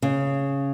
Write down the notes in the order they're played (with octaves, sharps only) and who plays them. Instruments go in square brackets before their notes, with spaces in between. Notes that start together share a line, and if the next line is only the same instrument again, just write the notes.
[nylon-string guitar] C#3